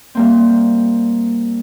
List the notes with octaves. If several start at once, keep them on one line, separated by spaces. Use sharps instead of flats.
G3 A#3 C4